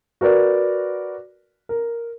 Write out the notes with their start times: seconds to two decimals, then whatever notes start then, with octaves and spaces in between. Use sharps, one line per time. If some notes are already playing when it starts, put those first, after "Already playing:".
0.21 F#4 A#4 B4 D5
1.69 A#4